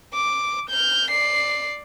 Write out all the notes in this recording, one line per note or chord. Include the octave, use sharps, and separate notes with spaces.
D6
F6 G6
D5 C7